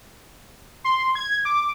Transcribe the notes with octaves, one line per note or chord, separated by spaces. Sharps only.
C6
G#6
D6